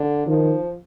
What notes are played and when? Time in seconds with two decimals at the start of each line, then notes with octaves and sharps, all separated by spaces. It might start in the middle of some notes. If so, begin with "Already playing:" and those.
Already playing: D3
0.27 D#3 F3